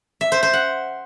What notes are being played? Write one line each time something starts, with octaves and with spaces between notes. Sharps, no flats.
E5
C5
C5
F#5